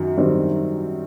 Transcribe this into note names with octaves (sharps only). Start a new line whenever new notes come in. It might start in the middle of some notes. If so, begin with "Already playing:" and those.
Already playing: F#2 D#3
F#2 D#3 G3 C4 D#4